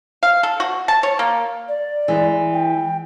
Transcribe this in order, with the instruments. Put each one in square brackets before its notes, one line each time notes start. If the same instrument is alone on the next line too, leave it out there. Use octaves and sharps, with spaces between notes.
[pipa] F5
A4
F#4
A5
C#5
A#3
[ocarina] D5
[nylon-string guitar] E3 G#3
[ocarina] G5